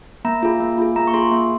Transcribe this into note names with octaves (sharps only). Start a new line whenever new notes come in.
A#3 A#5
F4 G#4
A#3
F4 G#4
A#3 A#5
C#6
F4 G#4 C6
A#3